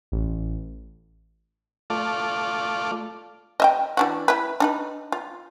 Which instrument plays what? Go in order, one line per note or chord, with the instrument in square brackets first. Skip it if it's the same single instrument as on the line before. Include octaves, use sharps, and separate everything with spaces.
[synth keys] A1
[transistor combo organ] A3 F4 D5
[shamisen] D#5 E5 G5
E3 D4 F#4
E4 B4
D4 D#4 B4
F4